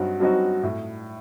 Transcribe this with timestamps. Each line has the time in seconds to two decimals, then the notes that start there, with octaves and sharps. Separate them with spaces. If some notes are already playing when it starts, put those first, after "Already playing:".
Already playing: G2 F#3 C4 D#4 F#4
0.20 G2 F#3 C4 D#4 F#4
0.63 A2